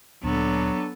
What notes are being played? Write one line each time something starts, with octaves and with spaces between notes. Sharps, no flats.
D2 A#2 F#3 B3 D4 A4